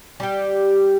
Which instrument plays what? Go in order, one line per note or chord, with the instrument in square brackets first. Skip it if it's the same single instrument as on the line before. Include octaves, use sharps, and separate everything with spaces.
[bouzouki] G3 G4